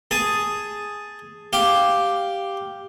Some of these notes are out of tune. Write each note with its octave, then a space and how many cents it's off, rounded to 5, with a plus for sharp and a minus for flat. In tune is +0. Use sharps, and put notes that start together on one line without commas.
G#4 +0 A5 +0
G4 +0 F5 +0